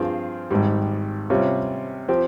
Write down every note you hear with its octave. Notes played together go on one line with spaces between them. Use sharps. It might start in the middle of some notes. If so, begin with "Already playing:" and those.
Already playing: G2 F3 C4 F4 G#4
G#1 G#2 G3
C3 G3 C#4 F4
F3 C4 G4